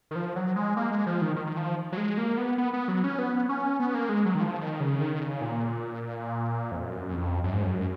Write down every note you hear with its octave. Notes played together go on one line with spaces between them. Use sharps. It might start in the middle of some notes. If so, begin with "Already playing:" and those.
D#3
F3
F#3
G#3
A#3
G#3
F3
D#3
D#3
D#3
F3
F#3
G#3
A#3
B3
B3
B3
F#3
C#4
B3
C#4
B3
A#3
G#3
F#3
D#3
F3
D#3
C#3
D#3
C#3
A#2
F2
F#2
F2
F#2
G#2
F#2